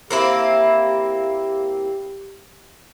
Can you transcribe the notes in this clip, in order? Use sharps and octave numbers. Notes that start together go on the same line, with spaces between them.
A#3 C4 E4 G4